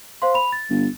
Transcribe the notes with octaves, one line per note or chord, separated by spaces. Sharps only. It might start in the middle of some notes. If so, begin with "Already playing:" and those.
C5 F5 C6
B5 F7
A6
G1